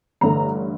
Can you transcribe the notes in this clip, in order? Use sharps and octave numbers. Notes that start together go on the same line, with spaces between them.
A1 G2 D3 A3 A#5